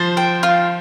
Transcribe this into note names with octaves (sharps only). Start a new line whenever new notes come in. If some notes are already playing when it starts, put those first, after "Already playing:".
Already playing: F3 C5
G5
F4